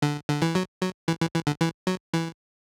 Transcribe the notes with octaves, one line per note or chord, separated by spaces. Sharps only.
D3
D3
E3
F#3
F#3
E3
E3
E3
D3
E3
F#3
E3